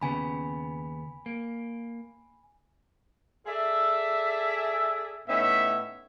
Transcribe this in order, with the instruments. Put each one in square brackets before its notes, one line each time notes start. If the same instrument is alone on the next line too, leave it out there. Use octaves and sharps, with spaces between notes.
[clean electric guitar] D#2 C#3 B3 [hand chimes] G#5 B5
[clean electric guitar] A#3
[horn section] G#4 A4 D5 E5
A2 B3 C#4 D#4 E5